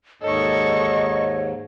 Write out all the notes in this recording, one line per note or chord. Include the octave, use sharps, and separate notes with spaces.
D#2 G#2 A4 C#5 D#5 C#6